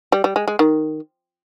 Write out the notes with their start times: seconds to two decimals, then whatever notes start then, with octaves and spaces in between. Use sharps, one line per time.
0.12 G3
0.24 G3
0.36 G#3
0.48 G#3
0.59 D#3